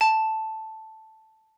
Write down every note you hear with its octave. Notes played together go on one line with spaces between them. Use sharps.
A5